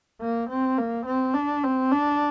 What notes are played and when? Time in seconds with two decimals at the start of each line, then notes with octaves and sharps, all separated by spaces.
0.21 A#3
0.50 C4
0.78 A#3
1.06 C4
1.34 D4
1.63 C4
1.91 D4